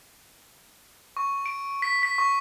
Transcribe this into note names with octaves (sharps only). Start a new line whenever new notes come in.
C#6
D7
B6
B6
C#6